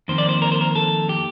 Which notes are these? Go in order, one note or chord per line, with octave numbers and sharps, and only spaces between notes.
F2 D#3 A#3 C5
D5
C5
A#4
C5
A#4
A4
G4